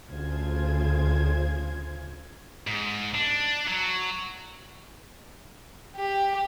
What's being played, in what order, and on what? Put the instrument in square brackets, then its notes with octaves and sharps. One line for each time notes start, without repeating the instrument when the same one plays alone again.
[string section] D2 C#3 F4 G#4 C5 G#6
[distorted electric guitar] G#2
D4
F#3
[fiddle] G4